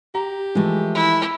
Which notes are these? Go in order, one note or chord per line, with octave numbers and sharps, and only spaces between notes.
G4 A#5
E3 F3 G#3 A3
E4